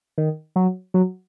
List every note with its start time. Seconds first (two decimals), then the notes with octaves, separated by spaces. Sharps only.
0.18 D#3
0.56 F#3
0.94 F#3